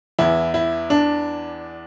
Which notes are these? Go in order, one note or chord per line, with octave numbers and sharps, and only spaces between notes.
E2 E3 E4
E4
D4